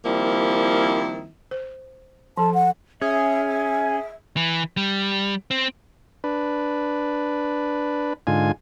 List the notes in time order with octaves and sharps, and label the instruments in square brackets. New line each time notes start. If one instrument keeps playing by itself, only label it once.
[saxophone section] D#3 F3 G3 A#3 C4 E4
[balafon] C5
[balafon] F3 A4 [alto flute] A5
[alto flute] F#5
[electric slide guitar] C#4 [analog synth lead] G#4 [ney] E5
[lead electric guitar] E3
G3
C4
[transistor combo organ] D4 B4
G#2 D3 F4 G#5